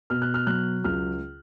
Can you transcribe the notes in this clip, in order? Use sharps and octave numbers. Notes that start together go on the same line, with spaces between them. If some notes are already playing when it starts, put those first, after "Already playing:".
B2 F6
F#6
F6
F#3 F#6
C#2 F6